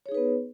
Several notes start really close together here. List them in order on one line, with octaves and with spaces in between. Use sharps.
C#5 G#4 D#4 B4 B3